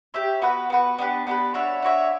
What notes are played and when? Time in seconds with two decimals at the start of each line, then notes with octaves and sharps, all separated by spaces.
0.14 G4 C#5 E5
0.42 B3 F#4 B4
0.70 B3 F#4 B4
0.98 B3 D4 G4 B4
1.27 B3 D4 G4 B4
1.54 D4 F#4 C#5 E5
1.82 D4 F#4 C#5 E5